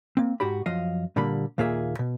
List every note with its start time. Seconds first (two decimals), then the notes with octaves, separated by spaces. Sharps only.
0.17 A#3 C4
0.40 G#2 F#4 G4 B5
0.66 F#2 F3 D#5 F5
1.16 A#2 D3 G3 A#3 B5
1.58 D#2 A#2 A#3 F4 G#4 E5
1.99 B2